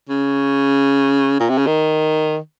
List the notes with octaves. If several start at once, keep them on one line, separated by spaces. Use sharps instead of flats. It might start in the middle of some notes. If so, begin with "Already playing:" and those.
C#3
A#2
C3
C#3
D#3